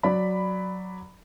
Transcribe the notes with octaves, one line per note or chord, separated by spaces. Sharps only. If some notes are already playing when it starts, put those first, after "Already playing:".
F#3 D5 B5